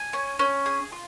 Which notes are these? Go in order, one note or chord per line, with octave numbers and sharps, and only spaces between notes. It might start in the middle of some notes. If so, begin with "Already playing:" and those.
Already playing: G#5
C#4
C#4
G#4
F4